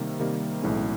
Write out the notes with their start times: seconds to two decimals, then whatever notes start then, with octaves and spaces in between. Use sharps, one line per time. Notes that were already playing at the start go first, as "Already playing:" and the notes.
Already playing: C3 D#3 G3 A#3
0.19 C3 D#3 G3 A#3
0.62 B1 A2 E3 G#3 C#4